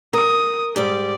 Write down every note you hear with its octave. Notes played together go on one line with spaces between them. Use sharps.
A#4 D#6
G#2 G3 G4 D5